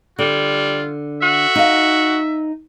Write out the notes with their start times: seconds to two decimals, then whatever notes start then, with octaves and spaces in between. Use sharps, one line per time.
0.19 D3 G3 F4
1.22 F#4 E5
1.56 D#4 F5